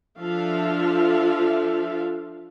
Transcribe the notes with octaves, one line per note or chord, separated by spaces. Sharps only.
F3 D4 F4 A4 E5 F5